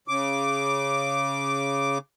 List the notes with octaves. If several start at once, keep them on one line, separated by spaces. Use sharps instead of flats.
C#3 D6